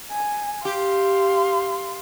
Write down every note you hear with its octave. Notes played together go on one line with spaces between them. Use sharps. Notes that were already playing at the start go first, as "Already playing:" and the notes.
G#5
G4 F5 C6